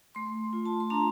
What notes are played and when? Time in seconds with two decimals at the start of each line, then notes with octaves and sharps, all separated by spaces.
0.15 A3 C6
0.53 F4
0.65 A5
0.80 C6
0.90 D4 A#5